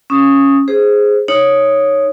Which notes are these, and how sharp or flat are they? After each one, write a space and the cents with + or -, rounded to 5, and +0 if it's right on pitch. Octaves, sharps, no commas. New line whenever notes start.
C#4 -5 D#6 +5
G#4 +0 C5 +0
D#4 +0 C#5 +0